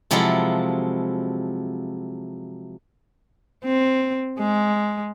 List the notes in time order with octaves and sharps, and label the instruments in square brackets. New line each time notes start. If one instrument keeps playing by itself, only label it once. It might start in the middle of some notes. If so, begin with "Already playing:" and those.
[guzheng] C3 F3 F#3 G#3 E4 A4
[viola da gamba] C4
G#3